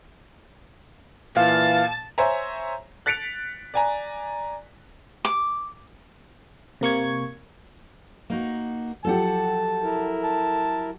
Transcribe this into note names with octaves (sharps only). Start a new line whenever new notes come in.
A#2 E3 F5 A5
C5 C#5 E5 G#5 A#5
F#6 A6 B6 C#7 D7 F7
D5 G#5 A#5
D6
C3 A#3 C#6 G#6
A#3 D#4 F#4
F3 F#3 G4 A4 F#5 A5
E4 A#4
A5